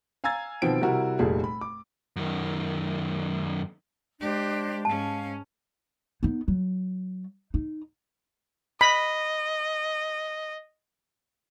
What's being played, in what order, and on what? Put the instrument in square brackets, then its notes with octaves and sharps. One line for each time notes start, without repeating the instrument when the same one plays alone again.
[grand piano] F5 G#5 A#5 E6 G#6 A6
B2 D#3 F3 C4 D7
C3 G3 E4 F#4 A#4
F1 A#2 G3 G#4 A4
B5
D6
[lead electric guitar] F#2 D#3
[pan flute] G#3 [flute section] D4 C5 [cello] G4
[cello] G#2 C#4 [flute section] F5 [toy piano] A5
[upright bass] B3 D#4
F#3
D#4
[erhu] D#5 [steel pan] B5